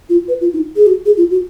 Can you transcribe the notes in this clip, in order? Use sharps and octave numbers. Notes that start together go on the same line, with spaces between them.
F4
B4
F4
D#4
G#4
F#4
G#4
F4
F#4